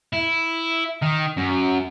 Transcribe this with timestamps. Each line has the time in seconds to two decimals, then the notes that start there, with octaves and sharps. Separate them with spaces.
0.13 E4
1.02 D#3
1.37 F#2